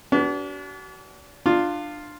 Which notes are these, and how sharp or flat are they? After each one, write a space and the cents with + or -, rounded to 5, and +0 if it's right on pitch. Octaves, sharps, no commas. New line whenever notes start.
D4 -40 F#4 +40 B4 +0
D4 +25 F4 +0